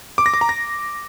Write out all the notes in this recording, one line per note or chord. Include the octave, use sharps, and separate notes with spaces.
D6
A#6
D6
A#5
A#6